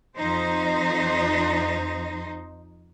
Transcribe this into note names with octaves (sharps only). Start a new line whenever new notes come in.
F2 D#4 C5